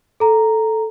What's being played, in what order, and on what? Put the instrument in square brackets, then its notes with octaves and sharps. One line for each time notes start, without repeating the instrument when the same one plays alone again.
[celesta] A4 A#5